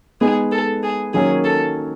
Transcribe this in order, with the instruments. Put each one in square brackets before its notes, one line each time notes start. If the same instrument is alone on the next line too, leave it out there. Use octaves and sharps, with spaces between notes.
[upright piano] G#3 B3 D#4 [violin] G#4
[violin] A4
G#4
[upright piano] D#3 F#3 A#3 C#4 [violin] G#4
[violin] A4